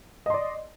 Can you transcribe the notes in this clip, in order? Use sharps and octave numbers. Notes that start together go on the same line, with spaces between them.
D5 D#5 C6